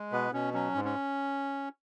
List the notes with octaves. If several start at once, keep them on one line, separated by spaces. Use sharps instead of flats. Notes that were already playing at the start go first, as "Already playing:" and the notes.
Already playing: G#3
B2 B3 B4
B2 C#4
F#3 C#4
G#2
C#4